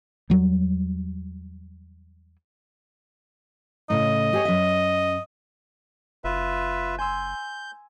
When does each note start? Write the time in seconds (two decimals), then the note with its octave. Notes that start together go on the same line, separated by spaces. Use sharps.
0.30 E2 F#3 G3
3.90 A2 C#3 D#5
4.33 G4 G#4 C#5
4.45 F#2 E5
6.24 F#1 F4 B4 E5
6.98 G#5 C6 E6 G6